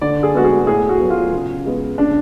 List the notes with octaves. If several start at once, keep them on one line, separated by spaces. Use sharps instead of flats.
D3 D5
G#4
G#3 B3 F#4
G#4
A2 G#4
F#4
F#3 B3
F4
C#3
G#3 B3
C#3 D4